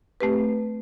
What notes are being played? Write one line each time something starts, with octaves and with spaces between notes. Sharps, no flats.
A3 C4 G4 B4